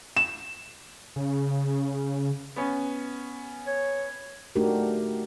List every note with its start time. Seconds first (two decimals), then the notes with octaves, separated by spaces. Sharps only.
0.17 E7
1.16 C#3
2.56 B3 C#4
3.67 C#5
4.56 A3 D4 D#4 F#4 G4 A#4